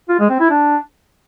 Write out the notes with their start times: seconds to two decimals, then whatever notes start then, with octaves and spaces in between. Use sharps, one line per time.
0.09 F4
0.20 G#3
0.30 C4
0.40 E4
0.51 D4